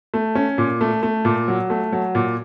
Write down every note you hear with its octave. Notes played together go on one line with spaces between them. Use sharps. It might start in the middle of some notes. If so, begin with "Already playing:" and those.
A3
C#4
A#2
A3
A3
A#2
F#3
A3
F#3
A#2